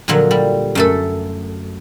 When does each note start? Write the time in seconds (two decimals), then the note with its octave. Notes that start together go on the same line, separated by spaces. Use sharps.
0.08 A#2 D3 F3 F#3
0.31 G3
0.75 F#2 A3 A4